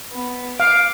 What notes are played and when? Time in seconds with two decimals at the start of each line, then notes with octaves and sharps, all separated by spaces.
0.12 B3
0.60 F5 D6